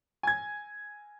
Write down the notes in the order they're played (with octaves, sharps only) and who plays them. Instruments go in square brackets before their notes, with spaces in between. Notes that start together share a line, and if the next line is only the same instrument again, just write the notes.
[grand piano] G#5 G#6